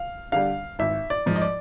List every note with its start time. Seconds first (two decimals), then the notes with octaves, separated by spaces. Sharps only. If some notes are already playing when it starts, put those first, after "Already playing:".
Already playing: F5
0.32 D3 G3 F5
0.79 G#1 E5
1.10 D5
1.26 G#2 F3
1.36 D#5
1.42 D5